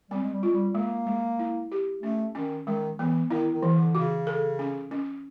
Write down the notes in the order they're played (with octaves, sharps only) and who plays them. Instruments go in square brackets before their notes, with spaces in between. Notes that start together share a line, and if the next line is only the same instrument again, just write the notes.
[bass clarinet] G3 [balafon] C4
[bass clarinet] G#3
G3
[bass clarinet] G#3 [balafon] F4
[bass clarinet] G3
[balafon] G#3 [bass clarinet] A#3
[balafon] G#3
E4
G4
[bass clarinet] A3 [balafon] C#4
[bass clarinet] D#3 [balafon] C#4
[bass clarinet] D#3 [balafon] G#3
[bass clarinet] E3 [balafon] B3
[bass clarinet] D#3 [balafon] E4
[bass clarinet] D#3
[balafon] E3
[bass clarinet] D3
[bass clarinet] C#3 [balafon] F#4
[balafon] A4
C#4
C#4